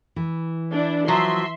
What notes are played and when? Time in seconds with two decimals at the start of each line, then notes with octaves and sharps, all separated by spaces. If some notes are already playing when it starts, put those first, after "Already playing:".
0.16 E3
0.72 D4 E4
1.08 F3 F#3 E5 C6